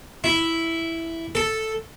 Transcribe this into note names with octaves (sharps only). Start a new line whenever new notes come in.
E4
A4